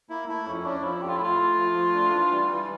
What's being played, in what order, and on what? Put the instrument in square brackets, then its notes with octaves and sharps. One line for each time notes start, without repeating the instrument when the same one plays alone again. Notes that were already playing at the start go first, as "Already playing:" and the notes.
[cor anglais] A#3 [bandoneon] E4
[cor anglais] A3 [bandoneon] E4
[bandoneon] F2 [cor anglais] C#4
[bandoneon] C#4 [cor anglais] D4
[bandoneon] F3 [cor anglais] E4
[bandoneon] F2 [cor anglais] G4
[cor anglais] F4
E4
[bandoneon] A3 [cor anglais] F4
[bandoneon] A3
F3
A3
D4
E3
G3
E3